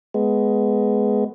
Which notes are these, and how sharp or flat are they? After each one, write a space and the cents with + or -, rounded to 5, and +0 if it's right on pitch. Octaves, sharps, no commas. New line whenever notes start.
G#3 +15 B3 +10